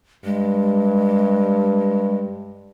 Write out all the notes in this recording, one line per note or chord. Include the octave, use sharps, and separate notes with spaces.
G2 G#3